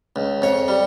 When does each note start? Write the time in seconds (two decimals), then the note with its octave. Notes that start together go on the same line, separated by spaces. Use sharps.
0.16 C#2
0.42 F2 C#5
0.68 G3